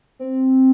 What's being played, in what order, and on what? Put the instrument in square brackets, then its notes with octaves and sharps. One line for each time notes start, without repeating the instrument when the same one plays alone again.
[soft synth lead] C4